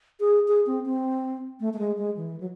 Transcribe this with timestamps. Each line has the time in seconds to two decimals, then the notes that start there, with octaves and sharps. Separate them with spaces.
0.20 G#4
0.48 G#4
0.67 C4
0.85 C4
1.60 A3
1.73 A3
1.79 G#3
1.98 G#3
2.16 E3
2.40 F#3